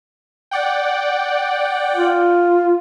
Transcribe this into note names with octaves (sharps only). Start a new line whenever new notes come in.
D5 F#5 G5
F4